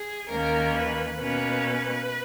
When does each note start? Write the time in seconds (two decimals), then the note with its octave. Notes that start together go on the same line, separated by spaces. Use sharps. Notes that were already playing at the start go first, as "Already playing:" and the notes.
Already playing: G#4
0.30 D#2 D#3 A#3 C#4 A#4
0.75 B4
1.19 B2 A#3 C#4 B4